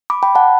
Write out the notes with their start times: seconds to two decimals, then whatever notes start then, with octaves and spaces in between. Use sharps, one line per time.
0.10 B5 D6
0.23 G5 B5
0.35 F#5 A5